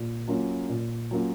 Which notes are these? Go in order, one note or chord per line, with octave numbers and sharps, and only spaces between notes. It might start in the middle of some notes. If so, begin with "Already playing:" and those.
Already playing: A#2
F#3 A#3 C#4 F4
A#2
F#3 A#3 C#4 F4